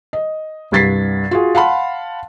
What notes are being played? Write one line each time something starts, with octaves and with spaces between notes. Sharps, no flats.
D#5
C2 G2 G#6 A6 B6 C7
F4 F#4 G#4
F5 F#5 A5 B5 C6